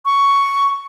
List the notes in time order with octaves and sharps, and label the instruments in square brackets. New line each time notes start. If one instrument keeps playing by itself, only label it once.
[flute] C#6